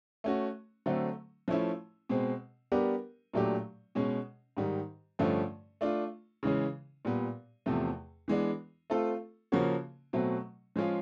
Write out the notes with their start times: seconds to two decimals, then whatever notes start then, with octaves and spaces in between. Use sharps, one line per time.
0.24 A3 C#4 F#4
0.86 D3 F#3 A3 C4
1.48 F3 A3 C#4 E4
2.09 B2 G#3 C4
2.72 G3 B3 D4 G4 A#4
3.34 A#2 F#3 A3 D4 G4
3.95 B2 G#3 C#4
4.57 G#2 D#3 G3
5.19 G2 D3 F3 A3 C#4
5.81 A3 D4 F4
6.43 C#3 E3 G#3 C#4
7.05 A#2 G3 B3
7.66 E2 C3 F3 A3
8.28 E3 G#3 B3 D4
8.90 A3 C4 F4 A4
9.52 C#3 F3 A#3 C#4 F#4
10.13 B2 F#3 A3 C4
10.76 F3 G#3 C#4 F4 G#4